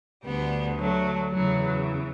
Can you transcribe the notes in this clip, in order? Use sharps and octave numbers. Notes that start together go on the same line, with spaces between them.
D2 D3 G3 B3
F#3 A3
E2 C#3 E3 F#3